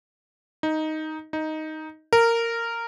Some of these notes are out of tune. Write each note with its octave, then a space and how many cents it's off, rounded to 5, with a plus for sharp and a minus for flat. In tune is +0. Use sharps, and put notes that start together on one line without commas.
D#4 +5
D#4 +5
A#4 -15